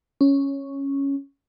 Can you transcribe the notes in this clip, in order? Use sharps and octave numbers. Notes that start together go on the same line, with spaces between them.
C#4